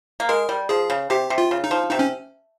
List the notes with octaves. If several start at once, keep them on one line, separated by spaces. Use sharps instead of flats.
A#3
G#3 A#4
G3
F3 G#4
C#3
C3 G4
C3
F4
C#3
D#4
F3
C3 D#4
C#4